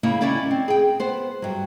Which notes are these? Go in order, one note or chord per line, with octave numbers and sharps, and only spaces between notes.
C#3 A#3 E4 C#5
D#2 C#4 E4 D5 E5
C4
G#4 G5
B3 C5
G2 F#3